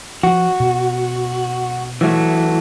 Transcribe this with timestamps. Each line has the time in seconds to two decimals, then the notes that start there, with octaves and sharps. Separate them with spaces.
0.23 F3 F#4
0.60 B2
2.01 E3 F#3 A3